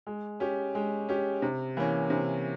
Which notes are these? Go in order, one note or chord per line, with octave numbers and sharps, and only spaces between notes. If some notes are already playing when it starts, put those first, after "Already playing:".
G#3
C#4 G4
G#3
C#4 G4
C3
E3 A#3 C#4
C3